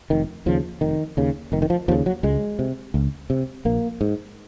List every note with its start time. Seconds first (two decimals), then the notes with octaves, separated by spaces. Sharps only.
0.10 F1 D#3
0.46 D#2 C#3 F3
0.81 F1 D#3
1.17 D#2 C#3
1.52 F1 D#3
1.62 D#3
1.70 F3
1.88 D#2 F3
1.91 C#3
2.06 F#3
2.23 C#2 G#3
2.59 C3
2.94 C#2
3.30 C3
3.65 A#1 A#3
4.01 G#2